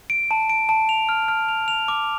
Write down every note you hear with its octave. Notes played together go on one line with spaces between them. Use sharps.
D7
A5
D7
A5
F7
F6
F6
F7
F7
D6